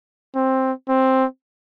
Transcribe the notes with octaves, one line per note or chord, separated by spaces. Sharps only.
C4
C4